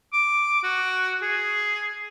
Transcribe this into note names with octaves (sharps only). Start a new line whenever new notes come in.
D6
F#4
G#4